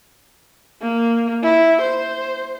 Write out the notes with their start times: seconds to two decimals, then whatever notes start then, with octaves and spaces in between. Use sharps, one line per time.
0.82 A#3
1.43 E4
1.81 C5